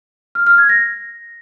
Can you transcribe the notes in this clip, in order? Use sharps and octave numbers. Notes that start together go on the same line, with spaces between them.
F6
F6
G#6
A#6